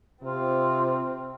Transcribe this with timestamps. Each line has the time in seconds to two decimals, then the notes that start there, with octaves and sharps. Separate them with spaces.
0.23 C3 C4 F4